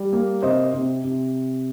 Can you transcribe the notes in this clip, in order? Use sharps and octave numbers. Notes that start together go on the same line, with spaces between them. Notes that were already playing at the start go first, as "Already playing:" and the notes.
Already playing: G3
A#3
C3 C5 D#5
C3
C3